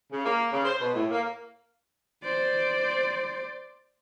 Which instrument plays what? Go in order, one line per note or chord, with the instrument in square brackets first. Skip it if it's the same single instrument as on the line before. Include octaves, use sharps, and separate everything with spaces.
[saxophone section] C#3
A#3
C#3
C5
B2
A2
A#3
[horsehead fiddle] C5 D5